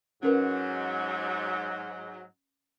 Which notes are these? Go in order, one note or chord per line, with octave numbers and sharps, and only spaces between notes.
G#2 F#3 C#4 A#4 B4